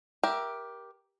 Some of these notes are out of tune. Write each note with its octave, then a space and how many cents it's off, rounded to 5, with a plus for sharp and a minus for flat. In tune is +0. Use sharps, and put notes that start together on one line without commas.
G4 +0 A#4 +20 E5 +5